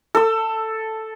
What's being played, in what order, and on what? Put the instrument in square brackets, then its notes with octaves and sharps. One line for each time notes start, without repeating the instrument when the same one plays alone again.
[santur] A4 E6